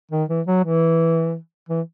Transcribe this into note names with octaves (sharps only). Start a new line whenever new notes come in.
D#3
E3
F#3
E3
E3